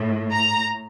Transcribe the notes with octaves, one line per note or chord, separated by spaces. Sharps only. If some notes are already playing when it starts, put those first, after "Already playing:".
Already playing: A2
A#5